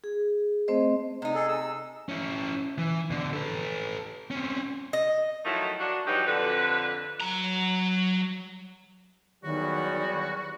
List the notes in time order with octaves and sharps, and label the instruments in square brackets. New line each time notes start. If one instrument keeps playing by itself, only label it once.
[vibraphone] G#4
A3 C4 C5 D#5
[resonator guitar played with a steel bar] C3 D#4
[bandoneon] G#4 A4
E6
[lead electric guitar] C#4 E4
E3
B2 D3
A4 B4
C4 C#4
[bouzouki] D#5
[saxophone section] D#3 F3 F#3 A3 D#4 E4
D4 F#4
G2 E3 F#3 G3 D#4 G4
F2 D3 B4
[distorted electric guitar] F#3 A#5
[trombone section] E2 F#3 G3 [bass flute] D#3 [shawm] F#4